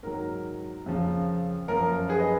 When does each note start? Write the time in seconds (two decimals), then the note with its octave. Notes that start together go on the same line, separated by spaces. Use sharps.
0.03 G#2 D#3 F#3 A#4
0.86 F2 C#3 F3
1.68 F#2 F3 A#4
2.09 G#4 B4
2.20 D#5